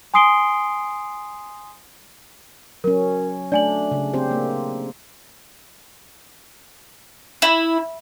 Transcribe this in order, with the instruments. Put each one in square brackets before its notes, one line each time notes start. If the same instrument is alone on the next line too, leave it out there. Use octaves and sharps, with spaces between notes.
[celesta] G#5 C6 D#6 C7 D7 G7
[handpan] F#3 C#4 [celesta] A#4
[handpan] A3 D4 [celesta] D5 G#5 F#7
[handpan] C#3
C4 G4 C5
A#3
[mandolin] E4